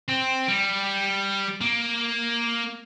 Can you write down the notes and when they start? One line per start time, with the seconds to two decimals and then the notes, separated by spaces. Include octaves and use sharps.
0.09 C4
0.49 G3
1.61 A#3